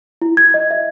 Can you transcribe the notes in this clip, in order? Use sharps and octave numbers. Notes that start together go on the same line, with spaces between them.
E4
G#6
D#5
E5